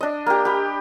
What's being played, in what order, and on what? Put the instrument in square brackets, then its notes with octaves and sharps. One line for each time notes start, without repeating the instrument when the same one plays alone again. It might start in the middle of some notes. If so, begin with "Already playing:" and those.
[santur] D4 D#5
A#3 G4
G4 B5